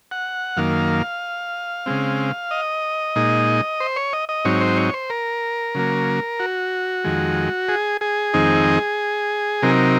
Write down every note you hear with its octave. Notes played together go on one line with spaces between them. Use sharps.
F#5
F#2 D#3 A#3 F5
C#3 G#3 C4
D#5
A#2 G#3 D#4
C5
C#5
D#5
D#5
G#2 F#3 C4 D#4 C#5
C5
C#5
C5
A#4
C#3 F#3 A#3
F#4
F2 D#3 G#3
G#4
G#4
F2 D#3 G#3 C4 D#4
C3 F#3 C4 D#4 A#4